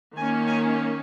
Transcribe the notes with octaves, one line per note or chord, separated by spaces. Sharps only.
D#3 A#3 C#4 G#5
G#5